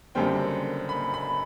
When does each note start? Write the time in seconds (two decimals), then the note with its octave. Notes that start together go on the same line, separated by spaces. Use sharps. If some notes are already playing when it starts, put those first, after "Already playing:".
0.15 F#1 F#2 D3 G3 C4 G5
0.89 B5
1.14 B5